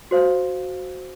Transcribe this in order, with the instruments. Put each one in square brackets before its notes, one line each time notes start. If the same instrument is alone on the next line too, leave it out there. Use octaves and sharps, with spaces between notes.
[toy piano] F#4 C5 F5